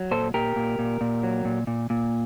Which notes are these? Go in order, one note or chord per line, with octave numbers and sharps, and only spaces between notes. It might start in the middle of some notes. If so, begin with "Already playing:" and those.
Already playing: F#3
A#2 A4 C5
A#2 G4 A#4
A#2
A#2
A#2
F#3
A#2
A#2
A#2